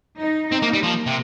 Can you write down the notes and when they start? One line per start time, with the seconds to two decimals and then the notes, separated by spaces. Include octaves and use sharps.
0.18 D#4
0.51 C4 D#4
0.62 A#3
0.74 G3
0.83 F3 A#3
1.06 C3